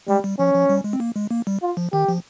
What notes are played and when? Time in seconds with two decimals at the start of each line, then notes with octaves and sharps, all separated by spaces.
0.08 G3 G#3
0.24 G3
0.39 F3 C#4
0.54 F3
0.69 G3
0.84 G#3
0.93 C4
1.00 A#3
1.16 G#3
1.31 A#3
1.47 G3
1.62 F4
1.77 F3
1.93 D#3 G4
2.08 F3